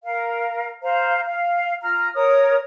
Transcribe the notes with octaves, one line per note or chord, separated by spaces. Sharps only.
A#4 F5
C5 F5 A#5
F5
F4 A#5 F6
A#4 C#5 D#6